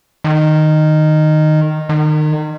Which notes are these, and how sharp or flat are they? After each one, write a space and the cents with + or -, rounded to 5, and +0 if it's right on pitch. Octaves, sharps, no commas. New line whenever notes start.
D#3 -10
D#3 -30